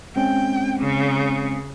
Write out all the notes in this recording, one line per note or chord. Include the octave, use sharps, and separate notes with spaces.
G#3 C4 C#4 G5
C#3